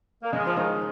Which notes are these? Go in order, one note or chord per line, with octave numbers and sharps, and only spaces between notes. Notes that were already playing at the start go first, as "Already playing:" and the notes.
A#3
C#3 G#3
F3
D#3 G#3 D#4